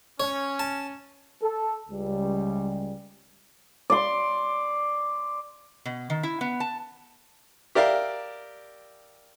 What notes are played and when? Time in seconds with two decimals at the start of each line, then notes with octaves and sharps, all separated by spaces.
0.20 C#4 C#5
0.59 A5
1.42 A4
1.89 C#2 G3
3.90 D5 C6
5.85 B2
6.10 D#3
6.23 E4
6.41 B3
6.60 A5
7.75 G4 A#4 D5 E5 F5